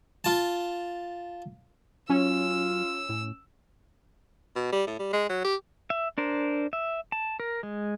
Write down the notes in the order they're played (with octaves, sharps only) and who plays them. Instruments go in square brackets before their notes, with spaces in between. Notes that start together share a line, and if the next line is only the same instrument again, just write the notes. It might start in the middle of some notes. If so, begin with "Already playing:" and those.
[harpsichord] F4 A5
[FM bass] F#3 [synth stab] C#4 [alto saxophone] F4 [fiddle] E6
[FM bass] A2
[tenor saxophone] B2
G3
A2
G3
G#3
F#3
G4
[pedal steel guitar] E5
D4 A#4 C5
E5
A5
A#4
G#3